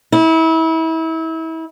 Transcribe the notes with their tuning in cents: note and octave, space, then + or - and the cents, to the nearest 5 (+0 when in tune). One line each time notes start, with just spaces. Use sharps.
E4 -30